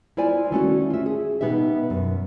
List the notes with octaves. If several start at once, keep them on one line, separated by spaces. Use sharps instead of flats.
E4 F4 C5 D5 G#5
D#3 A3 C#4 F#4
F4 E5
G#4
B2 B3 D#4 G4 E5
F#2